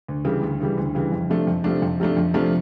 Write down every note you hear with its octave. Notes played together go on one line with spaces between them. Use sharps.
D2
C#3 E3 G3
D2
C#3 E3 G3
D2
C#3 E3 G3
F2
C3 F3 A3 D4
F2
C3 F3 A3 D4
F2
C3 F3 A3 D4
F2
C3 F3 A3 D4